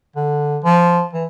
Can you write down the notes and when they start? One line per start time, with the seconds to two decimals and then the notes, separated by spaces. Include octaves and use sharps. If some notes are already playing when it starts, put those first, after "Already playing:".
0.16 D3
0.64 F3
1.13 E3